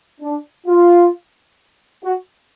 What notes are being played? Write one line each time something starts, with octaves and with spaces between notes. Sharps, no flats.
D4
F4
F#4